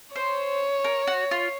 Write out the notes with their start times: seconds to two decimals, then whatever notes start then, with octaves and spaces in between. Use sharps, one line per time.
0.16 C5 C#5
0.84 A#4
1.07 F#4
1.31 F4